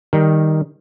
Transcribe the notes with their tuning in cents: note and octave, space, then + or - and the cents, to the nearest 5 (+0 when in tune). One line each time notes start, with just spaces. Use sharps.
D#3 +0 G3 +15